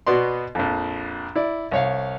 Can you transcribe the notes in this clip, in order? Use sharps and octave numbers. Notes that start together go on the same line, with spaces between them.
B2 B3 F#4 D5 C6
A#1 F2
E4 D5
C2 C#5 F5